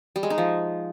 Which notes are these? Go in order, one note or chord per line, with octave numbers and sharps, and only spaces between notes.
G3
G#3
D#4
F3